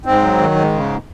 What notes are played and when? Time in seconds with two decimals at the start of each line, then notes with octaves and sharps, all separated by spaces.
0.05 G#2 C4
0.22 F#3
0.39 D#3
0.56 G#2
0.73 C#3